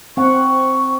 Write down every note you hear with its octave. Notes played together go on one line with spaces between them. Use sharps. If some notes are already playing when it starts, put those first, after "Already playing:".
C4 F#5 C#6